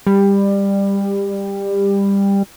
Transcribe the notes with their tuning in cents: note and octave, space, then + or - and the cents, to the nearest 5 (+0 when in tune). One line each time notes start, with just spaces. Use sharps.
G3 +20